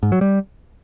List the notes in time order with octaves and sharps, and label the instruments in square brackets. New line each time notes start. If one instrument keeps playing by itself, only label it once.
[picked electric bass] G#2
F#3
G3